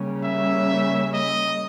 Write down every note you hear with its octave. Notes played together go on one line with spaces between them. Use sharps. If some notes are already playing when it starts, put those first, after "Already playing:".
Already playing: C#3 G3 A#3 C#4
E5
D#5